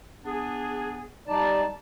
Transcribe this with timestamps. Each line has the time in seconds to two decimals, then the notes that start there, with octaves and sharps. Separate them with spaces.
0.25 B3 D4 G#4
1.28 G3 D#4 D5 A5